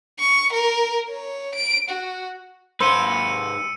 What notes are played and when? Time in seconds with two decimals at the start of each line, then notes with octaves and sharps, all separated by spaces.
0.20 C#6
0.53 A#4
1.09 C#5
1.55 D7
1.89 F#4
2.80 G#2 B4 C5 E6 C#7 D#7